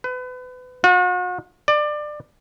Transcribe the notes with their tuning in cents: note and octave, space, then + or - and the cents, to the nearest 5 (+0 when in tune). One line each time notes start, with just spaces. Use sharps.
B4 +30
F#4 -40
D5 +25